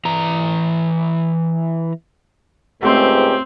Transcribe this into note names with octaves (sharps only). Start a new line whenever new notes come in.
E3 A#5
C#2 G#2 A3 C4 G4 C#5 C6